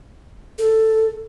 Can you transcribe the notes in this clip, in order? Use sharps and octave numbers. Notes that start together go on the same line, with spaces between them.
A4